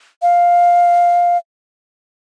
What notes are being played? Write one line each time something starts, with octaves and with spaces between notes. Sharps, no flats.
F5